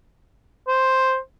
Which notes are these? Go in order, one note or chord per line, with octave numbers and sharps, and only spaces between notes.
C5